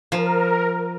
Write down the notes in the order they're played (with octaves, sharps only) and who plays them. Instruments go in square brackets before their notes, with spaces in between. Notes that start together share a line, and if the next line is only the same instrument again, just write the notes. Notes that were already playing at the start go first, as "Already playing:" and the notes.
[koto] F3 [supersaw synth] A#4